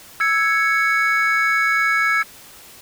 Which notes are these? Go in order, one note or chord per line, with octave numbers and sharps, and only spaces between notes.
E6 G#6 C#7